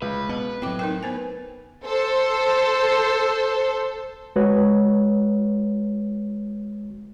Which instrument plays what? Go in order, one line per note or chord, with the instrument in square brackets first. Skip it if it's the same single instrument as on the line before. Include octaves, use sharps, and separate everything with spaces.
[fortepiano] C#2 [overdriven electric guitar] B4
[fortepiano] B2 [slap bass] B3
[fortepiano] A2 [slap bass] F#3 C4 [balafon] G5 D6
[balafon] D#4 A#4 G5
B3 C5 G#5
[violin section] A4 C5
[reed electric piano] G#3 F#4 B4 C#5